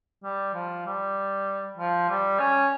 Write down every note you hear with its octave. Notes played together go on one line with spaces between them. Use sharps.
G3
F3
G3
F3
G3
C#4